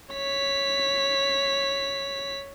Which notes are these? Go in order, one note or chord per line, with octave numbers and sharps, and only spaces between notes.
C#5 B6